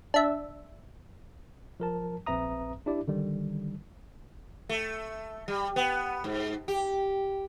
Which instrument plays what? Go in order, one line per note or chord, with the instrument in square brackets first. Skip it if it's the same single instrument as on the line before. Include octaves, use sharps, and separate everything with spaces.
[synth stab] D4 E5
[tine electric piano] F3 A#4 A5
A#1 C4 B4 E5 A#5 D#6
D4 E4 G4 D5
D3 D#3 G3
[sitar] A3
G3
B3
G#2
G4